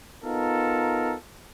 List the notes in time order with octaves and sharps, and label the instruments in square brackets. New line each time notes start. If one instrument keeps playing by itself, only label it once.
[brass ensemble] B3 D#4 F4 A4 A#4